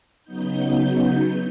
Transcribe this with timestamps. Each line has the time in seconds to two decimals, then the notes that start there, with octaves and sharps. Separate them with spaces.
0.24 C#3 F#3 B3 D#4 G6